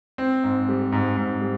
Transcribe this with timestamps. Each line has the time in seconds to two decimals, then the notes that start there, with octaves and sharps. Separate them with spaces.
0.18 C4
0.44 G#2
0.69 G3
0.92 G#2
1.17 G#2
1.41 G3